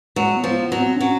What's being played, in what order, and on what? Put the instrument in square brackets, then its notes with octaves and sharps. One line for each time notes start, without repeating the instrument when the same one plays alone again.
[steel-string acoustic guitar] F#3 [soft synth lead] G#3
[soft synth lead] B3
[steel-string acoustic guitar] F3
[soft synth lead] B3
[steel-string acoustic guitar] F#3
[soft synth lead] C4
D4
[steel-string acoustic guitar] F#3 [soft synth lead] C#4